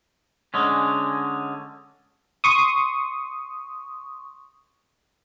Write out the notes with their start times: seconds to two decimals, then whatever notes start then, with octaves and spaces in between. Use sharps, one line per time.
0.54 D3 G#3 C#4
2.44 C6 C#6 D#6